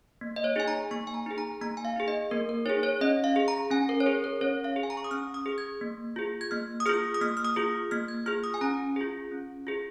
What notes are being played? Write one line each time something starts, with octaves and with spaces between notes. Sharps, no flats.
A#3
D#5
C#5
D#4 G#4 G#5
A#5
A#3 C#6
G#5
A#5
D#4 G#4
A#5
A#3 A#5
G#5
F5
D#4 G#4
D#5
A#3 A#4
A#4
D#4 G#4 C#5
C#5
C#4 D#5
F5
G#4
A#5
C#4 G#5
A#4
C#5
G#4 A#4
A#4
C#4 C#5
F5
G#4
G#5
A#5
C#6
D#6
C#4 F6
D#6
G#4
G#6
A#3
F4 G#4
G#6
A#3 F6
D#6
F4 G#4 F6
D#6
A#3 F6
F6
D#6
F4 G#4
A#3 F6
G#6
F4 G#4 F6
D#6
G#5
C#4 A#5
F4 G#4
C#4
F4 G#4